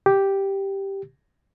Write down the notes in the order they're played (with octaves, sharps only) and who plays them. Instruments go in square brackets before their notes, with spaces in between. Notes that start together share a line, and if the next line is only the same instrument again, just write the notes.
[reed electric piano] G4